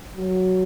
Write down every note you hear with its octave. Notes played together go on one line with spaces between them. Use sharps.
F#3